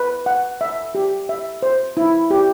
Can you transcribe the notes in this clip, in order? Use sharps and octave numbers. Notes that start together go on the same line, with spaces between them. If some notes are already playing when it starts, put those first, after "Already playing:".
Already playing: B4
F#5
E5
G4
E5
C5
E4
G4